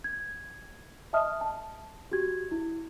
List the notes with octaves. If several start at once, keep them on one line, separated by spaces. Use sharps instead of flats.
G#6
D#5 E5 A5 D#6 F6
A5
F#4 G4 G#6
E4